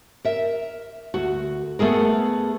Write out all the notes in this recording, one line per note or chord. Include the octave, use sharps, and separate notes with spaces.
A#4 E5
D2 F#4
A3 B3 G#4 A#4